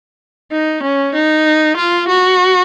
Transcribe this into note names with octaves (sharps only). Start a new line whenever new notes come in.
D#4
C#4
D#4
F4
F#4